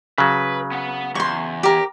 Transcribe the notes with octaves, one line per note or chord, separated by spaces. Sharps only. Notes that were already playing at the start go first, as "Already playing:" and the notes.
C#3 F#3 B4
B3 F#5
E2 C6 C#6
G4 A#4